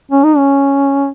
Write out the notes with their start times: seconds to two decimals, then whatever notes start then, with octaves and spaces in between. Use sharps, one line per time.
0.11 C#4
0.24 D#4
0.38 C#4